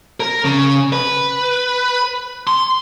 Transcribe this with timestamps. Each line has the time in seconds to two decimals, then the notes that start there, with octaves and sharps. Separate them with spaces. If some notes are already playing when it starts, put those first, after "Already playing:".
0.20 A#4
0.45 C#3
0.93 B4
2.47 C6